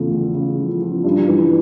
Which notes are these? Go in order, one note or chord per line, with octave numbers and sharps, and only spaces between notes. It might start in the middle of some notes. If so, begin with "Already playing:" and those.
Already playing: E2 C#3 F3 A3
C#3
C#3
F3
F3
G2
E3